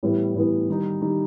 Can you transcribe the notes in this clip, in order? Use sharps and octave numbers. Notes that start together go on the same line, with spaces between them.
A2 E3 G3 B3 E4
A2 E3 G3 B3 E4
D#3 G3 D#4
D#3 G3 D#4